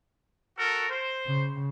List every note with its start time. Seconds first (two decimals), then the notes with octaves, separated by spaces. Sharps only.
0.57 F#4 A4 A#4
0.90 C5
1.27 C#3